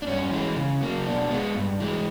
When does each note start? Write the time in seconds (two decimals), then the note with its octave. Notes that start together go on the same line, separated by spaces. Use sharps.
0.02 D4
0.07 G2 C#4
0.31 E3 G#3
0.56 C#3
0.81 F#3 A#3
1.06 B2 D4
1.31 G#3 B3
1.55 G2
1.80 E3 G#3